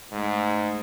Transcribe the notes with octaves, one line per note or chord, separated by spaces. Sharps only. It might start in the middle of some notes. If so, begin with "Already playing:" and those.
G#2 G#3 A3